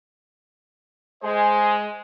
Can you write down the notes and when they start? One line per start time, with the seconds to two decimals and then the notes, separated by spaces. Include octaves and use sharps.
1.23 G#3 C5 D#5 G#5